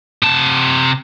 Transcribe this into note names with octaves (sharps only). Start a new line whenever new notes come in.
C3 A5